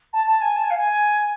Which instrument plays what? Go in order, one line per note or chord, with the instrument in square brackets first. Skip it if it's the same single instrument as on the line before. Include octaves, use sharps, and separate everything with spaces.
[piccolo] A5
A5
G#5
A5
G#5
F5
G#5